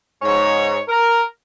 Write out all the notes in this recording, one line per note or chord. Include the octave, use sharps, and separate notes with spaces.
G#2 C#5
A#4